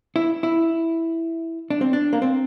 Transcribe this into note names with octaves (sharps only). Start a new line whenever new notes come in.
E4
E4
D4
C4
D4
A#3
C4